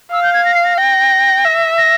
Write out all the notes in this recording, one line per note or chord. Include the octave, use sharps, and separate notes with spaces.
F5 E6
G6
G#6
A#6
C7
A#6
G5 A#6
E5
A#6